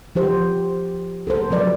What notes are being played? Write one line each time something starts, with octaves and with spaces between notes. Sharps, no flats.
F3 G4 C5
A4 A#4 C5
F3 F#3 B4 D5